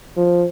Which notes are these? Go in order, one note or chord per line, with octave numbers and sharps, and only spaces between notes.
F3